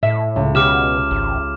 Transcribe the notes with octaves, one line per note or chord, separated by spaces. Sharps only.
A2 E5
C#2
B2 G4 D6 F6 E7
G#1